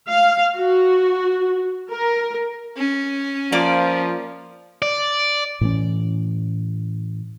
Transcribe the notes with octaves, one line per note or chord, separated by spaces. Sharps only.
F5
F#4
A#4
C#4
F3 A#3 D5
D5
A2 E3 C#4